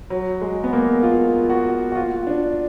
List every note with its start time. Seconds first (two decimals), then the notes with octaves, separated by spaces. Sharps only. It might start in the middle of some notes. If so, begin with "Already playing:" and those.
0.10 F#3
0.41 G#3
0.64 B3
0.73 A#3
1.03 F4
1.50 F#4
1.92 F#4
1.96 F4
2.27 D4